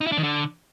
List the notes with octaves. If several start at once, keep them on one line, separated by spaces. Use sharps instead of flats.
D#4
E4
D4
D#3
D3